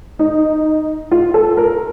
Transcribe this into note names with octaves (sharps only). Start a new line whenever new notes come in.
D#4
F4
A4
A#4